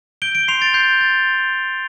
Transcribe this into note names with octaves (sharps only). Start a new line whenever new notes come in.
G6 D7 G7
D7 G7
C6 C7 F7
A6 D7
G6 C7
C6 A6
C6
G6